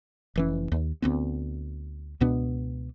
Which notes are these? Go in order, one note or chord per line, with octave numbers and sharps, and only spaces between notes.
F1 E3 C#4
D#2
D2 B3 C4
C#2 B2 B3 D4